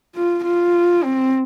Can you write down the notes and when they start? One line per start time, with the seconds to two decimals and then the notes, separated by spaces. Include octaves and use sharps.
0.15 F4
0.45 F4
1.03 C4